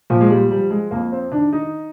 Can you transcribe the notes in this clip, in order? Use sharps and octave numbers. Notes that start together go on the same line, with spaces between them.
A#2 F3
G#3
G3
F3 G3
G#3
F2 A#3
C4
D#3 D4
D#4